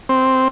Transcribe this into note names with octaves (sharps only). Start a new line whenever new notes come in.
C4